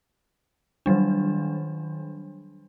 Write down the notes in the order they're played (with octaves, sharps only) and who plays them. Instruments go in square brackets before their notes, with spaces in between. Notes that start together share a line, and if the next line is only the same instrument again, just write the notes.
[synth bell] D#3 F#3 G3 D4